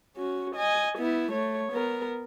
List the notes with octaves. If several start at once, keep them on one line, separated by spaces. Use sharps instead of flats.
C#4 F#4
D#5 G#5
B3 E4
A3 C#5
B3 A#4